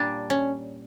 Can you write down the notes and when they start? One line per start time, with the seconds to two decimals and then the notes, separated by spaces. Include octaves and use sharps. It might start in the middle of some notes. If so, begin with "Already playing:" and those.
Already playing: A#2 G3 D4
0.30 C#4